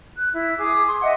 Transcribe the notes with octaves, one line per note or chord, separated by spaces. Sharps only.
F#6
E4
G#4 D6 D#6
C6
D#5 E5 F#5